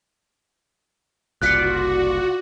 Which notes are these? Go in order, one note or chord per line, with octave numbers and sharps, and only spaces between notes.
F#1 C2 F4 F#4 D5 F#6 B6 C#7